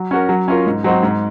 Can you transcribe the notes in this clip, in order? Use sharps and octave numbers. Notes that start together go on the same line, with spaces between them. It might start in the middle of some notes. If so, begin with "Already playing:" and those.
Already playing: F#3
C#4 F#4 A#4
F#3
C#4 F4 A#4
G#2
F#3 C4 D#4 F#4
G#2